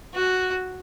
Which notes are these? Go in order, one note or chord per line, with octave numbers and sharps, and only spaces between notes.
F#4